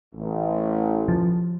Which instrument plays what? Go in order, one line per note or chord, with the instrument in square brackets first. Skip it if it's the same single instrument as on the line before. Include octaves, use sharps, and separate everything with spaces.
[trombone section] A1
[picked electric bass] F3